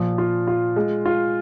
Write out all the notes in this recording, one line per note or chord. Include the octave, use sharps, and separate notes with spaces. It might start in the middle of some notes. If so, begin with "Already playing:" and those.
Already playing: A#2 F3
F4
F4
G#3
F4